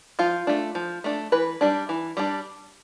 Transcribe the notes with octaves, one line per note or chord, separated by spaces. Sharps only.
F3 F4
A3 D4
F3
A3 D4
E3 B4
G3 D4
E3
G3 D4